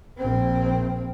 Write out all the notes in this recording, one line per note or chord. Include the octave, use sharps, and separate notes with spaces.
A#1 C4